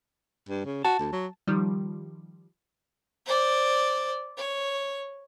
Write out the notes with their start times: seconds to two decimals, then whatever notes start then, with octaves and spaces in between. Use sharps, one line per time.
0.49 G2
0.65 C#3
0.85 F#4 A5
0.99 D2
1.12 F#3
1.47 D#3 F3 G3
3.26 C5 D5
4.37 C#5